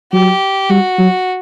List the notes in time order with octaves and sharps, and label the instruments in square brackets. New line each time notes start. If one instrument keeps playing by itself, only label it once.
[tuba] F#3 [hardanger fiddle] G4
[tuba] G3 [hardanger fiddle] F#4
[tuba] F#3